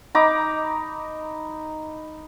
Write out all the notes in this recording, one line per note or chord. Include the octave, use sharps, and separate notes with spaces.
D#4 A#5 B5 D6